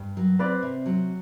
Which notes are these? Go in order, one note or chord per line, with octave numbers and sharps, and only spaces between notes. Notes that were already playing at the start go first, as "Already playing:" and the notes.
Already playing: G2
F#3
C4 B4 D5
C3
F#3